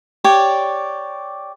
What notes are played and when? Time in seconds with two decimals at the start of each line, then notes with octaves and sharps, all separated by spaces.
0.24 G4 C#5 D5